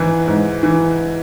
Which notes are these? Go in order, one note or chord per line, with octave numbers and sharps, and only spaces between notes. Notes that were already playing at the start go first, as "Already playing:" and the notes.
Already playing: G#2 E3
G#2
E3